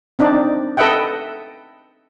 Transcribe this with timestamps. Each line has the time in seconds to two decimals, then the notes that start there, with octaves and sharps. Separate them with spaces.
0.19 C4 D4 D#4 D5
0.77 A4 B4 D#5 E5 F#5 G5